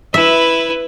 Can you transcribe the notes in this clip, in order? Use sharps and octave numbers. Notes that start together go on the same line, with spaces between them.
E4 B4 E5